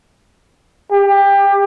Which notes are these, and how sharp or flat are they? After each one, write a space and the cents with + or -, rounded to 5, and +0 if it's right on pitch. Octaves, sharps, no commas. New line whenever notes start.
G4 +20